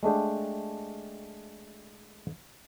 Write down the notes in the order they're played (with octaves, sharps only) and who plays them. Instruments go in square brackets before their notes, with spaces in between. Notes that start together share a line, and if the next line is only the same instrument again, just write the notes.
[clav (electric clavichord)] G#3 A3 D4 G4